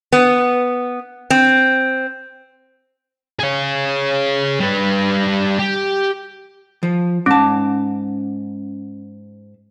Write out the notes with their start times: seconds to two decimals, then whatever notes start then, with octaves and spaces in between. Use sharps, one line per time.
0.12 B3
1.30 C4
3.39 G#4 C#5
4.60 G3 B4
5.59 G4
6.83 F3
7.26 G#2 C#4 A5